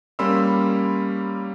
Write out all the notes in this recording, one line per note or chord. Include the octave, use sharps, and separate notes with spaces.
G3 A#3 C#4 B5 C6 E6